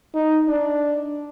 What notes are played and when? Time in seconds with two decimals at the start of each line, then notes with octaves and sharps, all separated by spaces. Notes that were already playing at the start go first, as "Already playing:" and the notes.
0.15 D#4
0.48 D4